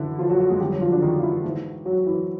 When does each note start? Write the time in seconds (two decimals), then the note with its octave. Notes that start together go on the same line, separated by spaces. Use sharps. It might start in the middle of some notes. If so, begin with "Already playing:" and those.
Already playing: F#2 D3 E3 E4
0.19 F3 F4
0.29 F#3 F#4
0.40 F#3 F#4
0.50 G#3 G#4
0.60 F2 D3 G3 G4
0.71 F#3 F#4
0.81 F3 F4
0.92 D3 D4
1.02 D#3 D#4
1.19 F4
1.23 E3 E4
1.44 G#2 E3
1.85 F#3 F#4
2.06 E3 E4